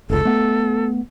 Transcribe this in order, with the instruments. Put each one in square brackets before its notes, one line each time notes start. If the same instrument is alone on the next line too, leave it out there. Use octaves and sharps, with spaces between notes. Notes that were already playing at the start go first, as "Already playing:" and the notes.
[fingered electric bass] F1 C#2 [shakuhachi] A4
[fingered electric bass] A3 B3